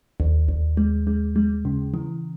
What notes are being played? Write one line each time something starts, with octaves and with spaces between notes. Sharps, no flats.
D#2
D#2
G#3
G#3
G#3
C#3
E3